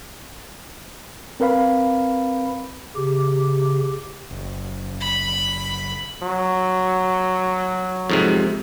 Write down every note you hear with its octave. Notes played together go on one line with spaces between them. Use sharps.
C4 A#4 B4 F5 B5
C#3 G4
F#1
B5
F#3
F2 G#2 C3